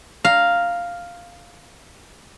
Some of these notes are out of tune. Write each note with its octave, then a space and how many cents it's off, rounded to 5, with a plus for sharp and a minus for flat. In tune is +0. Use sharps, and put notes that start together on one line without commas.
F5 +0 A#5 +0